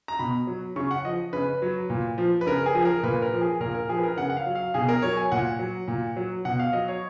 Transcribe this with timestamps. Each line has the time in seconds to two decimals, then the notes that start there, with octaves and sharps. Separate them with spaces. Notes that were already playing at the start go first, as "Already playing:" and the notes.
0.08 A#5
0.19 B2 B5
0.47 F#3
0.76 C#3 C#6
0.91 F#5
1.05 F3 D#5
1.33 C#3 B4
1.62 F#3
1.90 A#2
2.18 F3
2.41 B4
2.47 C#3 A#4
2.66 G#4
2.75 F3
2.85 A#4
3.03 A#2 B4
3.22 A#4
3.32 F3
3.41 G#4
3.60 A#2 A#4
3.75 A#4
3.89 F3 G#4
3.98 B4
4.03 A#4
4.17 C#3 F#5
4.30 F#5
4.37 F5
4.46 F#3
4.55 F5
4.74 B2 G#4
4.88 A#4
5.02 F#3 C#5
5.17 G#5
5.32 A#2 F#5
5.59 F#3
5.88 A#2
6.17 F#3
6.45 B2 F#5
6.59 F5
6.73 F#3 D#5
6.88 C#5